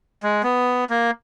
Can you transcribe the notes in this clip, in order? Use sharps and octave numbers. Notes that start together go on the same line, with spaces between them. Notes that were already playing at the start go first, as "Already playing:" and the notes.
G#3
B3
A#3